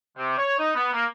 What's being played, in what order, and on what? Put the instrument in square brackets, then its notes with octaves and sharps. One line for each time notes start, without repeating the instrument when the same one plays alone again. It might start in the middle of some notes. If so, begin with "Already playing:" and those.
[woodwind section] C3
C#5
D#4
B3
A#3